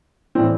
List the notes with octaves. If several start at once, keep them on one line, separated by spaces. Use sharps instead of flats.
A2 E3 G3 C4